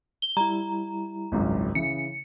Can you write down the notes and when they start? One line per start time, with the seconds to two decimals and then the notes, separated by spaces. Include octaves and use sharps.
0.22 G7
0.37 G3 E4 A#5
1.32 G#1 C#2 F#2
1.75 C#3 E3 C#7